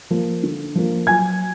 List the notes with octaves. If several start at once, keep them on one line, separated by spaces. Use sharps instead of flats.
F3 A#3
D3
F3 A#3
F#3 G#5 G#6